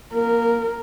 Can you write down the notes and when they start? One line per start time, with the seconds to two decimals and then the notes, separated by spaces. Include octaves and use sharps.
0.14 A#3 A#4